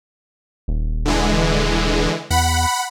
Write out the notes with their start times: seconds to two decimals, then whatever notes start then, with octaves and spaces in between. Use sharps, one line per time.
0.68 D#1
1.05 D3 E3 G#3
2.30 E2 F#5 B5